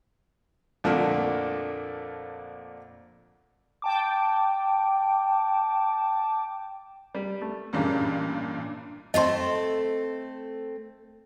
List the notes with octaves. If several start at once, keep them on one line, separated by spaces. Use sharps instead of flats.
F2 A#2 D3 A3 A#3 D4
G5 A5 D6
G3
A3
A1 G2 A#2 C#3 G3 A#3
A3 C4 A4 D#5 C6